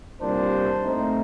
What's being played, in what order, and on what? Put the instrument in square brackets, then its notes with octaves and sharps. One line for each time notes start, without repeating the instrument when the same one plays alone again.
[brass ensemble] C2 A#2 G3 D4 C5
A2 A3 C4 D#4